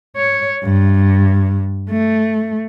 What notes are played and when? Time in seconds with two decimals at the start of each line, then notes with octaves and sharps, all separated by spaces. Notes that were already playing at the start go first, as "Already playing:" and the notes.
0.17 C#5
0.64 G2
1.90 A3